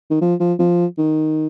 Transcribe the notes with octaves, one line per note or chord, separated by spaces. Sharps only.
D#3
F3
F3
F3
D#3